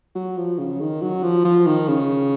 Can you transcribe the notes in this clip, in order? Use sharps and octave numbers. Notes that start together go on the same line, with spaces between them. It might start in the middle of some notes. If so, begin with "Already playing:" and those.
F#3
F3
C#3
D#3
F#3
F3
F3
D#3
C#3